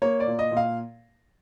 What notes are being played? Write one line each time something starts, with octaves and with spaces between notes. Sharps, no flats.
A#3 C#5
D5
A#2
D#5
A#2
F5